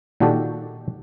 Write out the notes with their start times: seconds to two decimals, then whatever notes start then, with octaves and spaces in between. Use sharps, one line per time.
0.20 A#2 D#3 D4 F#4 G4 A4